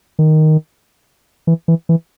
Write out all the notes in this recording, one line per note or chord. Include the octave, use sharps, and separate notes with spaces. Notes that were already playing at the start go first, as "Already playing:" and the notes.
D#3
E3
E3
E3